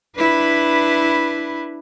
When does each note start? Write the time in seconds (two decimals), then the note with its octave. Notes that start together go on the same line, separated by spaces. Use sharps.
0.16 D4 E4 B4